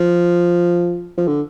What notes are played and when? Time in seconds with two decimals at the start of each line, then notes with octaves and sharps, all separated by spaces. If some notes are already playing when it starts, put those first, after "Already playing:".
Already playing: F3
1.18 F3
1.28 D3